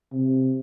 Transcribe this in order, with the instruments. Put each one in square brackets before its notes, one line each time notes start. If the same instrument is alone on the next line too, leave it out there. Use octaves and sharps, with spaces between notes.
[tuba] C3